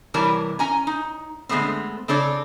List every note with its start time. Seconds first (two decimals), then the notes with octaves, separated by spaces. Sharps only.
0.14 C3 E3 G3 A#4 C#5 A5
0.59 C#4 G#5 A#5
0.87 D#4
1.49 D3 G#3 A3 B3 C4
2.08 C#3 C4 D4 A4 C#5 D5